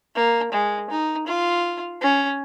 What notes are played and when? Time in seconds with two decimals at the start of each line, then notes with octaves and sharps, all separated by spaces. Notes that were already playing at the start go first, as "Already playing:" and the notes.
0.15 A#3
0.52 G#3
0.90 D#4
1.27 F4
2.02 C#4